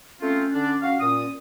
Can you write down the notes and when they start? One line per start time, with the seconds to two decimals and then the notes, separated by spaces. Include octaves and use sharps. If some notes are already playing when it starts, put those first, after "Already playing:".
0.21 A3 C4 C#4 F4
0.53 D3 D4
0.81 F#4 F5
1.01 A#2 D#6